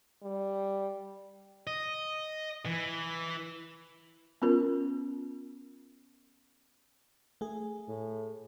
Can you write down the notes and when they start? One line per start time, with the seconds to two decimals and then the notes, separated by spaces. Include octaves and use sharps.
0.23 G3
1.67 D#5
2.66 E3
4.42 B3 C#4 F4 A#4
7.41 A3 G#4
7.89 A2